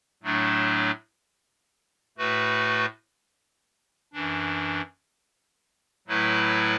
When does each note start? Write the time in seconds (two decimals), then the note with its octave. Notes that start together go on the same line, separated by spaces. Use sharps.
0.23 A2 F#3 A3 D4
2.17 A2 A3 F#4 B4
4.13 F#2 E3 D4
6.07 A2 F#3 A3 E4 B4